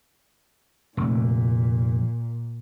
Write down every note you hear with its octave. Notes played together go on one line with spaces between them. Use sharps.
F1 A#2